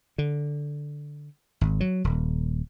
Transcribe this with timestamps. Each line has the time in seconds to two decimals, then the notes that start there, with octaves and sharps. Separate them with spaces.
0.18 D3
1.61 G#1
1.80 F#3
2.04 D#1